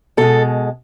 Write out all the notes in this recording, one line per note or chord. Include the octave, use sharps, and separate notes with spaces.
B2 G#3 A4